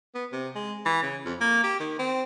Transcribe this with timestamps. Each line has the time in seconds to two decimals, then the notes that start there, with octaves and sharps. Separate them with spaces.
0.15 B3
0.32 C3
0.55 G#3
0.85 E3
1.02 C#3
1.25 F2
1.41 A#3
1.64 G4
1.80 D#3
1.99 C4